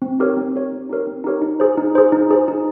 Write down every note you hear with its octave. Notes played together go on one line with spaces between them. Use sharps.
C4
D#4 G4 A#4 C#5
C4
D#4 G4 A#4 C#5
C4
D#4 G4 A#4 C#5
C4
D#4 G4 A#4 C#5
D#4
G#4 C5
D#4
G#4 C5
D#4
G#4 C5
D#4